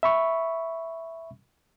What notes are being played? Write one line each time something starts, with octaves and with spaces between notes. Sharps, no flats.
E5 B5 C#6